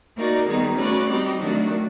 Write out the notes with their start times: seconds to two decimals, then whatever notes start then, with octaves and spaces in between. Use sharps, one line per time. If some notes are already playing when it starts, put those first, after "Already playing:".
0.17 A#3 D#4 F#4 A#4 D5
0.48 D#3 G3 B3 D#4 G#4
0.78 A3 C#4 F#4 B4 D5
1.09 G3 C4 D#4 G4
1.39 D#3 F#3 A3 D4 F#4